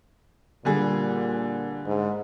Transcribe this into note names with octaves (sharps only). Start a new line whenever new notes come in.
A#2 D3 G3 G#4
G#2